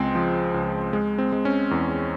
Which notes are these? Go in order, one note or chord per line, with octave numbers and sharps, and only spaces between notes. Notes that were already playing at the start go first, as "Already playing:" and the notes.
Already playing: C#2 G#3 C4
F3
C#2
G#3
C4
G#3
C#4
E2